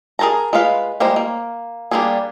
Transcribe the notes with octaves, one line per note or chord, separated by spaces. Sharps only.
G#4 A#4 C5 A5 A#5
G#3 F4 B4 F5
G3 G#3 A#3 C5
A#3
G3 A#3 C4 D4 G#4